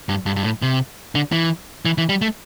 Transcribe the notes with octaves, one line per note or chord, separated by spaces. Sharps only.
G2
G2
G2
A2
C3
D3
E3
E3
E3
G3
A3